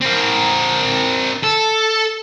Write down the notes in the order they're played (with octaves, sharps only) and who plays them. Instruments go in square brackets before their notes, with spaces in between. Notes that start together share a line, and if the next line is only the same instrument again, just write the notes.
[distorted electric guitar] C4 A#4
A4